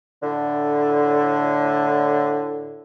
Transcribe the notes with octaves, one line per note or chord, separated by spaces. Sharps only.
A2 D3